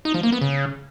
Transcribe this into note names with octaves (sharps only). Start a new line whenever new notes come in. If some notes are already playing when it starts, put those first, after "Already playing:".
D#4
F3
A#3
B3
C#3